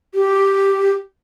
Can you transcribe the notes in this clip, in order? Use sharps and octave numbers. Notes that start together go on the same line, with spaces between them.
G4